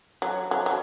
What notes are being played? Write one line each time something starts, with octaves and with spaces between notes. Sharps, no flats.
F#3
F#3
F#3